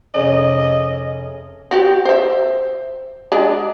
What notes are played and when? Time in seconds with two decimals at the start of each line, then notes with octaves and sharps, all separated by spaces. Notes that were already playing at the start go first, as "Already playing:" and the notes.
0.14 F1 C#4 G#4 D#5
1.71 C4 F#4 G4
2.05 C5 E5
3.32 G#3 D4